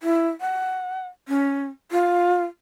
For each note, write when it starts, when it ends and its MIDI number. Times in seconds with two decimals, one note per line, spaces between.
0.03 0.28 64
0.41 1.08 78
1.28 1.67 61
1.91 2.44 65